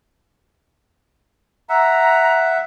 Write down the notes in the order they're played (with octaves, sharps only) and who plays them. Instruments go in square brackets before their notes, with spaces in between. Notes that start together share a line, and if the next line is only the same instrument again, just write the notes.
[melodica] E5 F#5 [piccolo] A#5